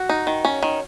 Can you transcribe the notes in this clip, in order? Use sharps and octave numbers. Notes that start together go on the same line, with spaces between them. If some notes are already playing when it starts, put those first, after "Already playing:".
Already playing: F#4
D#4
D#3
C#4
D#3